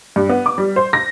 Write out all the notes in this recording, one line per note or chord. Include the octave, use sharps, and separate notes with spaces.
G2
B3
D6
G3
C5
A#6